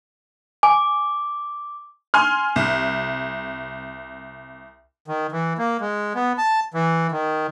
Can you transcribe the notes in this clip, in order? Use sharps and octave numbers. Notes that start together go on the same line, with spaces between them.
G#5 D6
G#5 C6 F6
C2
D#3
E3
A#3
G#3
B3
A5
E3
D#3